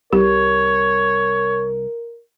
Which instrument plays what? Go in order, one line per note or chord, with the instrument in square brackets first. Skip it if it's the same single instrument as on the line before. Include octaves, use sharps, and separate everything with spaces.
[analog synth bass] C2 [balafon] G4 [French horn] A#4 [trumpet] C#5